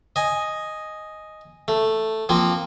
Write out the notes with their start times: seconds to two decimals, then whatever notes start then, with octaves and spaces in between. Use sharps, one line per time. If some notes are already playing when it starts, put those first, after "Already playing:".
0.16 D#5 G#5
1.68 A3
2.29 F3 A#3 C4